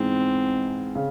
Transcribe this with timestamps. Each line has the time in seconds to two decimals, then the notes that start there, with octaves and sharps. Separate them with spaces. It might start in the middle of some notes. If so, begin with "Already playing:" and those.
Already playing: G#2 E3 G#3 B3 C4 D#4
0.95 C#3